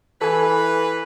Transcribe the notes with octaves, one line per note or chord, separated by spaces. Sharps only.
E3 A4 B4 G#5